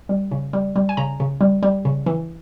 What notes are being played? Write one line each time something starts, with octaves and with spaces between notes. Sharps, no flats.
G3
C#3
G3
G3
G#5
C#3 A#5
C#3
G3
G3
C#3
E3